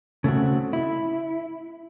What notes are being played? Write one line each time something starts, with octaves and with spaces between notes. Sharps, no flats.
C#3 A3 C4 F#4
E4